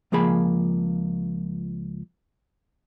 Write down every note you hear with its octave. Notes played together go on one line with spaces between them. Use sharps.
C#2 F3 A#3 G#4 B5